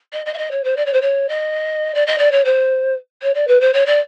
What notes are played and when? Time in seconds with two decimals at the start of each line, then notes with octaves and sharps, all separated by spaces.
0.13 D#5
0.26 D#5
0.34 E5
0.38 D#5
0.51 C#5
0.64 C5
0.77 D5
0.86 C#5
0.93 C5
1.02 C#5
1.29 D#5
1.95 D5
2.07 D#5
2.18 D5
2.32 C#5
2.45 C5
3.23 C#5
3.34 D5
3.47 B4
3.61 C5
3.73 C#5
3.86 D5